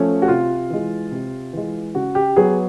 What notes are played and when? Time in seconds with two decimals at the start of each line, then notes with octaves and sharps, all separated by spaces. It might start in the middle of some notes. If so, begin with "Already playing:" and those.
Already playing: F3 A3 C#4
0.22 F#4
0.28 C3 F4
0.70 E3 G#3
1.11 C3
1.53 E3 G#3
1.95 C#3 F#4
2.15 G4
2.36 F#3 B3 G#4